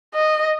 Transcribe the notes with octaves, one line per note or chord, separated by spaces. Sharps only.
D#5